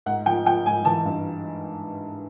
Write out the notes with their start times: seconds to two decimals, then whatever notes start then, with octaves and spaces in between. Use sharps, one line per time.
0.06 G#2 F#5
0.26 F3 G5
0.45 F3 G5
0.66 G#2 G#5
0.85 E3 A5
1.05 G2